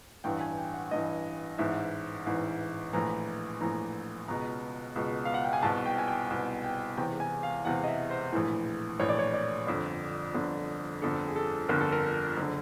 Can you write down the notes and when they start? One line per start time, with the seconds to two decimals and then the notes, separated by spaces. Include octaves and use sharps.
0.24 A1 G2 E3 G5
0.41 G#5
0.57 G5
0.74 F#5
0.91 A1 G2 E3 D#5
1.58 A1 G#2 E3 E5
2.26 A1 G#2 E3
2.93 A#1 A2 E3 A#5
3.61 A#1 A2 E3 A#5
4.28 C#2 B2 A#5
4.96 C#2 B2
5.25 F5
5.34 F#5
5.44 G5
5.53 G#5
5.63 C2 B2 A5
5.86 G5
5.98 G#5
6.08 G5
6.30 C2 B2
6.64 G5
6.97 E1 E2 C3 G5
7.20 G#5
7.43 F5
7.65 E1 E2 C3 F#5
7.84 D#5
7.88 E5
8.10 C5
8.32 A#1 A2 E3
9.00 A#1 A2 E3 C#5
9.09 D5
9.19 C#5
9.34 D5
9.67 G1 F2 D3
10.34 G1 F2 D3
11.02 G1 F2 D3 A4
11.28 G#4
11.36 A4
11.69 G1 F2 D3 A#4
11.81 A4
11.92 A#4
12.37 F#1 D3